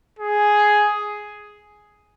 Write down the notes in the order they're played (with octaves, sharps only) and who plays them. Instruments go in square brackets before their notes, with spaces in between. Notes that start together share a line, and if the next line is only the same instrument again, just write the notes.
[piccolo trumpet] G#4